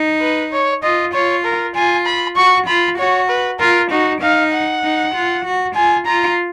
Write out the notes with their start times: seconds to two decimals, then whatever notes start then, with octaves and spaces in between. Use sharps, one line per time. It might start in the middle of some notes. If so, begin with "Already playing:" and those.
Already playing: D#4
0.21 B4
0.52 C#5
0.83 F4 D#5
1.13 F4 C#5
1.45 A#4
1.75 F4 G#5
2.06 B5
2.36 F#4 C#6
2.67 F4 B5
2.98 F#4 C#5
3.29 B4
3.59 F4 A#4
3.91 D#4 F#4
4.21 D#4 F5
4.52 F#5
4.83 D#4
5.14 F4
5.45 F#4
5.75 F4 G#5
6.06 F4 A#5